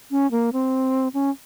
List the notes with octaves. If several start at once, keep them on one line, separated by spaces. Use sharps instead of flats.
C#4
A#3
C4
C#4